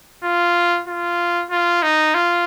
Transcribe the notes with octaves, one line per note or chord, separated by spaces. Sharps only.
F4
F4
F4
D#4
F4